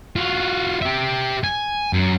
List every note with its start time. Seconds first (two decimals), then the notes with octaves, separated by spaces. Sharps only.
0.16 F4 F#4
0.82 G4 E5
1.44 G#5
1.93 F#2